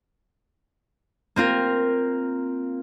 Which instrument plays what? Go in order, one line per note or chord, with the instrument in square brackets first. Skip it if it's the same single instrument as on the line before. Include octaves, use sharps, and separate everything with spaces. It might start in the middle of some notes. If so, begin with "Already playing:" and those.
[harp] A#3 C4 F4 A#4